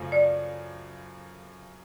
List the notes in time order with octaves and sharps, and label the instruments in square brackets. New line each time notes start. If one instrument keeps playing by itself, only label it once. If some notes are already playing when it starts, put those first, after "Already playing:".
Already playing: [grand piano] F#2 C#3 F3 A3
[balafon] D5